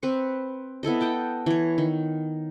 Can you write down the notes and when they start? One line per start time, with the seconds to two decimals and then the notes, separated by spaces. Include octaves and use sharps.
0.03 C4 B4 C6 C#6
0.83 B3 E4 A4 D#5
1.01 D#5 F#5 G5 A5
1.46 E3 C#5
1.78 D#3